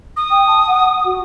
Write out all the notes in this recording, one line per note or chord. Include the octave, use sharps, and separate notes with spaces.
D#6
G5
A5
F#5
F#4